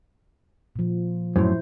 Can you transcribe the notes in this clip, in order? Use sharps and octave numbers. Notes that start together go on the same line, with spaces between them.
A#2 F3
F#2 A2 E4 C5